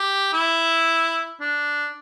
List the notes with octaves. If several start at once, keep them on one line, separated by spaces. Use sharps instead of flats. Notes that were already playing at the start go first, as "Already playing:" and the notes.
Already playing: G4
E4
D4